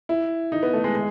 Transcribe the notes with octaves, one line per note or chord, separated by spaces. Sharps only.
E4
D#4
B3
A3
G#3
G#3